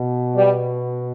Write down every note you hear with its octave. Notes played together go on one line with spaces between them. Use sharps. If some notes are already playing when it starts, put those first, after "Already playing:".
Already playing: B2
G3